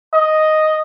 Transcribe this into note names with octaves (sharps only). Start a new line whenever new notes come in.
D#5